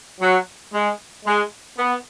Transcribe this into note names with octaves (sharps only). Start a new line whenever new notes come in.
F#3
G#3
G#3
B3